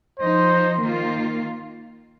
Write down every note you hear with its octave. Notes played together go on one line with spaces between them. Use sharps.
F3 D#4 C5
D#3 A#3 F4